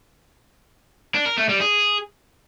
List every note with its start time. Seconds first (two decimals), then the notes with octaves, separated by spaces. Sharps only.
1.15 D4
1.26 A#4
1.38 A3
1.49 G3
1.61 G#4